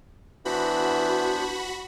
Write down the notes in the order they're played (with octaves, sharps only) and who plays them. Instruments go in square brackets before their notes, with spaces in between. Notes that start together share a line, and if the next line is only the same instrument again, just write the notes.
[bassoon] E3 [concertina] B3 D4 C5 [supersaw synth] F#4 B5